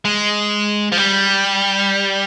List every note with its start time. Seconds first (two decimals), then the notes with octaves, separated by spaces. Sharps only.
0.05 G#3
0.92 F3
0.97 G3